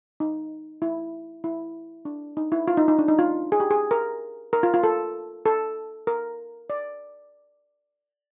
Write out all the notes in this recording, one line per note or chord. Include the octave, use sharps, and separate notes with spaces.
D#4
E4
E4
D4
D#4
E4
F4
D#4
D#4
D4
D#4
F4
G#4
G4
G#4
A#4
A#4
F4
F4
A4
A4
A#4
D5